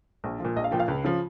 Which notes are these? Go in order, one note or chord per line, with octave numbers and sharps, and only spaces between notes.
A#1
F3
A#2
A#1 D#5
F5
A#2 F3 G5
F5
C#2
C#3 F3